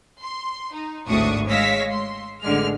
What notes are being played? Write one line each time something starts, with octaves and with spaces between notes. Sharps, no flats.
C6
D#4
G#1 D2 A2 D4 C#6 D#6
G#3 C#5 F5 E6 A#6 B6
C6
A1 D3 G#3 F6